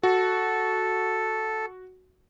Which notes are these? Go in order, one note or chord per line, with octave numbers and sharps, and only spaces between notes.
F#4 A4